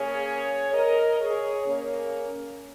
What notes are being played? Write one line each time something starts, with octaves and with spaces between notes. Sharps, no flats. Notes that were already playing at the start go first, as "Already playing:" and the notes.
Already playing: C#3 A#3 C#4 G#4 C#5
A#4 D#5
G#4 C#5
C#3 A#3 C#4